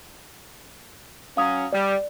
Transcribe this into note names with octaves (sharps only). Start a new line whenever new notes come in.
F#3 C#4 F5 D#6
G3 D5